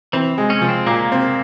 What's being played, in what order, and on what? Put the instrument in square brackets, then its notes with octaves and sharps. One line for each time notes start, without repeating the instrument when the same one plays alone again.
[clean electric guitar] E3 [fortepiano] C4
[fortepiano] G#3
[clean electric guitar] C#4
[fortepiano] F3
[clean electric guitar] C4
[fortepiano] A#2 [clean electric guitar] A#3
[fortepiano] C4